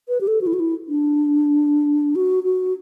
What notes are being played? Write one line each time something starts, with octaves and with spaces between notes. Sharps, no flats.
B4
G4
A4
F#4
E4
F#4
E4
D4
F#4
F#4